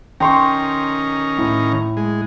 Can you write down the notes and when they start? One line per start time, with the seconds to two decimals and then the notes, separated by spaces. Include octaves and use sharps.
0.20 D#3 C#4 G5 A#5 C6 C#6
1.38 A2
1.97 G#3